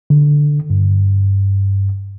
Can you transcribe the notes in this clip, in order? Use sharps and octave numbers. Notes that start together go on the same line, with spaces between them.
D3
G2